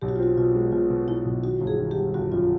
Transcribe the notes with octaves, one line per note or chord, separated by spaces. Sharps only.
B1 G4
F#4
F4
C4 F#4
B2 F4
G#3
B2 F4
B2
B2 E4
B1
D#3 F#4
G1
G#4
D#3
G4
G3
G1 F#4
F#2 F4